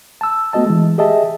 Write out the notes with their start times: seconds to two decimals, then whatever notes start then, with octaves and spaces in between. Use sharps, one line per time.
0.21 A5 E6
0.53 A3 B3 F#4 D#5 A5
0.66 E3 G#3
0.98 G4 G#4 D#5 E5 A5